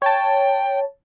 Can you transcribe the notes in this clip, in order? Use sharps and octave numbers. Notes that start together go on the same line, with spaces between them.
C#5 G5 A5